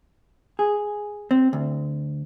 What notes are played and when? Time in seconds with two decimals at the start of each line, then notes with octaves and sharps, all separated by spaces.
0.59 G#4
1.31 C4
1.53 D2